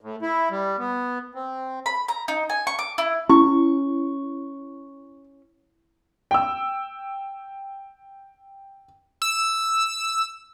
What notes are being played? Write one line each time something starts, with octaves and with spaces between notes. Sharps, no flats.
A2
E4
G3
B3
C4
B5
A#5
D#4
G#5
C#6
D6
E4
C#4 E4 C#6
G5 E6
E6